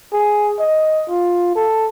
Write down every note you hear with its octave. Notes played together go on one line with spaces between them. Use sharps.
G#4
D#5
F4
A4